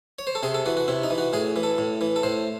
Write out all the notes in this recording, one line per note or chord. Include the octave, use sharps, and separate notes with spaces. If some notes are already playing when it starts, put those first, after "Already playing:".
C#5
C5
A4
C3 G#4
A4
E3 F#4
F#4
C3 E4
D#4
E3
F#4
A2 G#4
E3
A4
A2
E3
A4
A2 C5